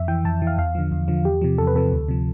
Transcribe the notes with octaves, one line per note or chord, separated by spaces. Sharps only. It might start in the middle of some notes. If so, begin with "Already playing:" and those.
Already playing: F2 E5
E3 G5
F2 A5
E3
F5
E2 F5
D3 F3
E2
D3 F3
E2 G4
C3 F3
E2 A4
B4
C3 F3 A4
D2
C3 F3